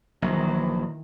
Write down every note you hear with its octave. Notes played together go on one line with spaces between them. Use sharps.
A#1 D#3 E3 F#3